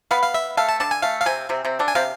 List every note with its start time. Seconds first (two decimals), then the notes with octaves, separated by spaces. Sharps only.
0.11 B3 B4 F5
0.23 F5
0.34 E5
0.57 A3 A4 F5
0.69 A5
0.80 D3 D4 A5
0.91 G#5
1.02 A3 F5
1.21 F5
1.26 C3 C4 G#5
1.49 C3 C4
1.65 C3 C4
1.79 D3 D4
1.87 G#5
1.95 C3 C4 F5